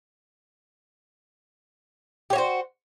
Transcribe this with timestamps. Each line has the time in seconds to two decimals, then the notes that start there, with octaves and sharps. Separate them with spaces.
2.30 G4
2.33 C#5
2.35 F#4
2.38 C5